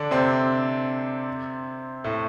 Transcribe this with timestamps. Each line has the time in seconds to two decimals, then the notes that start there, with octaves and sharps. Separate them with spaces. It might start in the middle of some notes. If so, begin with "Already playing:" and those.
Already playing: D3 D4
0.11 C3 C4
2.04 A2 A3